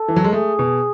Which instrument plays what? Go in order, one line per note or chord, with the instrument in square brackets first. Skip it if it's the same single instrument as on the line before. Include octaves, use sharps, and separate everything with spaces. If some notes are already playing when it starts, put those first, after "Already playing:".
Already playing: [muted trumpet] A4
[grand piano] E3
F#3
G#3
[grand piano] A3 [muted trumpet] G#4
[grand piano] B2